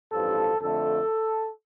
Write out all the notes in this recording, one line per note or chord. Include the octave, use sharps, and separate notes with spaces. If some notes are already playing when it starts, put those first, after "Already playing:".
A1 G2 F3 A4
F2 D3 A3 A4